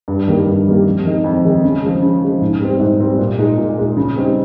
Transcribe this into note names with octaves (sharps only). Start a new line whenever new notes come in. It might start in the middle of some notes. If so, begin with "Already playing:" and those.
G2
D#3 G3 A#3
G2
D#3 G3 A#3
F2
D#3 G#3 D#4
F2
D#3 G#3 D#4
C#3
F3 G#3
C#3
F3 G#3
G#2
G3 C4
G#2
G3 C4
A#2
G#3 D#4
A#2
G#3 D#4
C#3
G3 C4 D#4